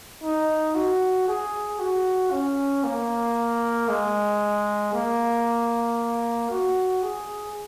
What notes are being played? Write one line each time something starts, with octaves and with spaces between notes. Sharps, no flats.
D#4
F#4
G#4
F#4
C#4
A#3
G#3
A#3
F#4
G#4